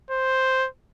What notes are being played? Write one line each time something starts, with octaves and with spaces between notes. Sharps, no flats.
C5